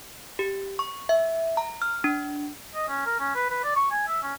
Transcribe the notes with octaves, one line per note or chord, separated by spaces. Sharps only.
G4
C#6
E5
A#5
F6
D4
D#5
C#4
A#4
C#4
B4
B4
D5
C#6
G#5
E5
C#4